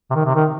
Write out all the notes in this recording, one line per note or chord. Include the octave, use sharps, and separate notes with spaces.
C3
D#3
C3
D#3